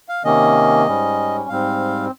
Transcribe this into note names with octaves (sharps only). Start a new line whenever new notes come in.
F5
C3 D#3 A#3 C#4 D#5
G#2 G3 C#4
G#2 G3 C4 F5